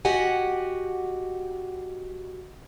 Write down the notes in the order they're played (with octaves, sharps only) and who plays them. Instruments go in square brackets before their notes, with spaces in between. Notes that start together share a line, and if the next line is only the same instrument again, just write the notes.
[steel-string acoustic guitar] F#4 G4 D#5 F#5 G#5